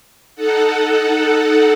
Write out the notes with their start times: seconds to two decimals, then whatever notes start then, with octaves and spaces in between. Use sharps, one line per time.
0.36 D#4 A4 F#5